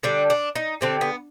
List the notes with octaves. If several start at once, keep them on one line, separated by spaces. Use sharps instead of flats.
D3 G3 D4
D4
D#4
D3 G3 C4
B3